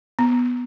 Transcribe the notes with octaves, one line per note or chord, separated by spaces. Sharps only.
B3